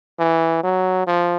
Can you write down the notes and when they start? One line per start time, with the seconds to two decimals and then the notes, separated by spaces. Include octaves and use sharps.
0.19 E3
0.63 F#3
1.07 F3